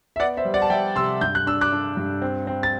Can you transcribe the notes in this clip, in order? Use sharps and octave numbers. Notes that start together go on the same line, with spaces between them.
E5
B3 D5 F#5
C5 E5
G3
D5 F#5
A5
G3 E5 G5
C3 C6 E6
G2 G6
F#6
D4 E6
D6 F#6
D4
G2
C4
C4
A6